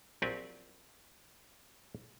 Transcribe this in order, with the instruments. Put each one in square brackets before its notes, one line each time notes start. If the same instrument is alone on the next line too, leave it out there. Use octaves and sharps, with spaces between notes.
[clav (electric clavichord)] A#1 F#3 C4 G4 D5 G#5